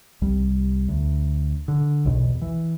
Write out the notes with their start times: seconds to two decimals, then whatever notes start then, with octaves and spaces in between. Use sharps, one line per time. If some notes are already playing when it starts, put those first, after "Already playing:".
0.22 C2 G3
0.88 D2
1.68 D3
2.05 B1 E2 B2
2.41 E3